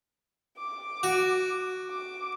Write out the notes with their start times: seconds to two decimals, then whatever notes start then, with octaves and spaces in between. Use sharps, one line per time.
0.58 D6
1.03 F#4
1.90 D6